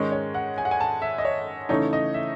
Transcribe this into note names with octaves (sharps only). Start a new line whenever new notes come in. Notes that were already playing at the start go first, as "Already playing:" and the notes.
Already playing: G#2 D#3 G#3 C#4 C#5
C#5
F#5
G#5
F#5
G#5
A5
E5
D#5
C#5
C#3 E3 A3 D#4 C#5
D#5
E5